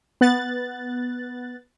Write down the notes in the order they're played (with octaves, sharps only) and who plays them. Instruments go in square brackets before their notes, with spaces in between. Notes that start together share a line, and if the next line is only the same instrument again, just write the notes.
[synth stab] B3 F#6 A6